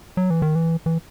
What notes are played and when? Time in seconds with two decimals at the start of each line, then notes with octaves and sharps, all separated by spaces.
0.17 F#3
0.30 E3
0.42 D#3
0.55 E3
0.86 E3